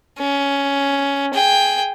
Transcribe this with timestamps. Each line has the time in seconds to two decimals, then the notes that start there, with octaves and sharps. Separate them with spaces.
0.19 C#4
1.34 G#4 G5